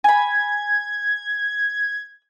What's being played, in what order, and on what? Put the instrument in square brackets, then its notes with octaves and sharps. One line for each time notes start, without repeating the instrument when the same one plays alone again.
[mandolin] G#5 B5 [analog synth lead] G#6